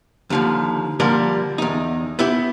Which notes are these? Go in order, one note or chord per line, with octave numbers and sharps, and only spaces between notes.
D#2 D3 F3
D3 F3 G3 A#3 D4 D5
E2 D#4
B3 E4 G4